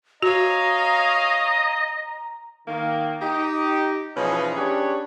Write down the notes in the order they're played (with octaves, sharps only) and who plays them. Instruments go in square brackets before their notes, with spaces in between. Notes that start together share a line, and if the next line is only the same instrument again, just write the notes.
[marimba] F#4 [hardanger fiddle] C#5 F5 [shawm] D#5 [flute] A#5
[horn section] D#3 A#3
D#4 G4
B2 E3 F3 C#4 D#4 G#4
C#4 D4 G4 G#4 B4 C#5